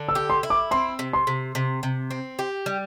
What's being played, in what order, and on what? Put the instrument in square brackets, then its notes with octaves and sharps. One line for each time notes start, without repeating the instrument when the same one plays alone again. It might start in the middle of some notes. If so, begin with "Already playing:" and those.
Already playing: [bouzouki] D3
[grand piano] E6
[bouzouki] G4
[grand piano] C6
[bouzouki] E4
[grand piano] D6
[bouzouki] C4 [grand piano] C6
[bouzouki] C3
[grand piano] C6
[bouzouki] C3
C3
C3
C4
G4
G3